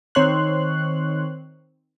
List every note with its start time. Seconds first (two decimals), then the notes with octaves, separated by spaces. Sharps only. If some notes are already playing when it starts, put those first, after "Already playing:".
0.15 D#3 C4 C#5 C6 F#6